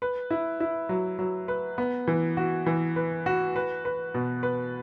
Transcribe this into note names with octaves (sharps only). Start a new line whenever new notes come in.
B4
E4
E4
F#3
F#3
B4
B3
E3
F#4
E3
B4
F#4
B4
B4
B2
B4